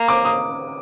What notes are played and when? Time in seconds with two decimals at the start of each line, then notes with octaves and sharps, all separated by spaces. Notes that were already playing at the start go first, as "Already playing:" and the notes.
Already playing: A#3
0.08 D6
0.25 D#6